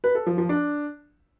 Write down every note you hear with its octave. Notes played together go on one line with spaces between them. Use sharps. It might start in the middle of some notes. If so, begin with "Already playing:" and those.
B4
A4
F3
F3
D4